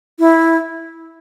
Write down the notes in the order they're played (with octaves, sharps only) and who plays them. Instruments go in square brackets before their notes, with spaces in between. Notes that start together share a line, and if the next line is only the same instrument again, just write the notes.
[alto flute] E4